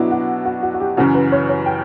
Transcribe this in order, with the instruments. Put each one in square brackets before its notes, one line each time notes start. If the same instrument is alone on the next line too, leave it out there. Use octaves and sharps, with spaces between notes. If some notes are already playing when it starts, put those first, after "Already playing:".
Already playing: [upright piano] B2 F#3 B3 D4 [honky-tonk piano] E4 F#4
[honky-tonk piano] F#4
F#4
F#4
F#4
G4
[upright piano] F#2 C#3 E3 [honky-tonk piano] F#4
[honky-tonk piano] B4
C#5
C#5
G5